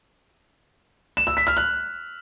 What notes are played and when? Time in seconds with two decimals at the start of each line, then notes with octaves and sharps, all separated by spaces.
1.17 E7
1.27 E6
1.37 B6
1.47 F6
1.57 F#6